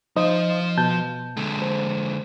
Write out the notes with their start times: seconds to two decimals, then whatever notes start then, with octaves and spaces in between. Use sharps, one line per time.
0.16 F3 D#4 C5 D#5 F5
0.77 B2 A5 G6
1.37 D3 G#3
1.62 C5